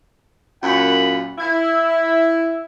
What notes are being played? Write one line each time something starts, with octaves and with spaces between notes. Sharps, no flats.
F#2 A#2 F#5 B5
E4